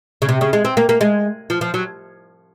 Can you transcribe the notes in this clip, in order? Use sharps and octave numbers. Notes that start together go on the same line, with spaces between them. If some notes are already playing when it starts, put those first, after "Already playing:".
C#3
C3
C#3
G#3
C4
A#3
A#3
G#3
F3
F3
F#3